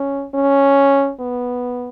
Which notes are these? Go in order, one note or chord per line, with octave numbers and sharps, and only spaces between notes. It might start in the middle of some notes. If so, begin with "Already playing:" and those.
Already playing: C#4
C#4
B3